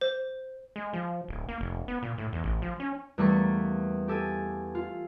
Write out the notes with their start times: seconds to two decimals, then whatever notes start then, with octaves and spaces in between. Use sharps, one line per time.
0.01 C5
0.76 G#3
0.93 F3
1.28 D1
1.49 A#3
1.61 F1
1.88 B3
2.02 A#2
2.18 A2
2.33 E2
2.44 A1
2.62 F3
2.80 C#4
3.18 E2 G3 A3 A#3 C#6 A6
4.08 G4 A4 G#5 A5
4.75 F4